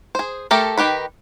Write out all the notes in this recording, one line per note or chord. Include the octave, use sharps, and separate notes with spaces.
G#4 C5
A3 G4 A4 A#4
D#3 G4 B4 B5